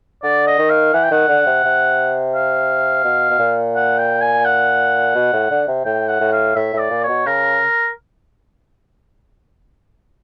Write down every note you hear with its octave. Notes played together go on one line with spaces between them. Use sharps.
D3 D5
D#5
D#3
F5
E3 F#5
G5
D#3 F#5
D3
C3
C3
F5
B2
B2
A#2
F#5
G5
G#5
F#5
B2
A2
D3
C3
A2 G5
F#5
A2
F5
A2 E5
A2 D5
A#2
C#5
B2
C#3 A#4